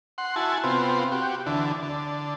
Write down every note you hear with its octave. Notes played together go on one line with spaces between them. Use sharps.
F#5 C6
E4 F#4 G#5 A5
C3 B3 C4 F4
F#4 G4
D2 D3 E3
D3